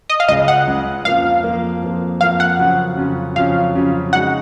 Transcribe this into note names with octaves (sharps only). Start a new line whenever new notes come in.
D#5
F5
C#2 C#3 G#3 D#5
F#5
C#2 C#3 G#3
F2 F3 A#3 F5
F2 F3 A#3
F2 F3 A#3
F2 F3 A#3 F5
F#5
F2 C#3 F#3 C#4 F4
F2 C#3 F#3 C#4 F4
F2 C#3 F#3 C#4 F4 F5
F2 C#3 F#3 C#4 F4
C#3 G#3 D#4 F#4 F#5